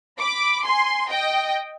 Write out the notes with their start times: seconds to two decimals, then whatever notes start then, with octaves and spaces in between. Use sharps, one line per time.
0.20 B5 D6
0.66 G#5 C6
1.10 D#5 G5